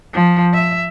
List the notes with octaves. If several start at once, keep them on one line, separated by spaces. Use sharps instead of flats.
F3
E5